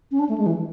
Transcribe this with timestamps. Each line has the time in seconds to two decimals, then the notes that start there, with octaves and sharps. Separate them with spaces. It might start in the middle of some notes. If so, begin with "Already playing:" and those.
0.11 C#4
0.19 D4
0.29 A3
0.38 G#3
0.46 E3